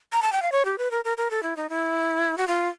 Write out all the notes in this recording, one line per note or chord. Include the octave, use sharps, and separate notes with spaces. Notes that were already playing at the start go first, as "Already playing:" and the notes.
A#5
A5
G5
F5
C#5
G4
B4
A#4
A#4
A#4
A4
E4
D#4
E4
F#4
F4